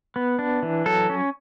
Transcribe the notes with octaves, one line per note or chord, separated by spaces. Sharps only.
B3
D4
E3
F#3 A4
C#4